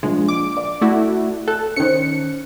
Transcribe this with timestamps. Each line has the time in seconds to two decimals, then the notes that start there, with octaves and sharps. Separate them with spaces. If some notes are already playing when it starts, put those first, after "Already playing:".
0.03 A#1 G#3
0.28 D6
0.57 D5
0.81 A3 E4 F#4
1.48 A4 F#6
1.76 D#3 C#4 C5 C#7